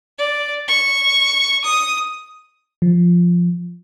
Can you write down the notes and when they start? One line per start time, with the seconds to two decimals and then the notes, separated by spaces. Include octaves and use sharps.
0.18 D5
0.68 C#6
1.64 D#6
2.82 F3